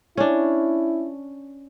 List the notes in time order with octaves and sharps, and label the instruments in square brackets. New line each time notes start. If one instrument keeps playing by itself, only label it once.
[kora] C#4 D4 [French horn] E4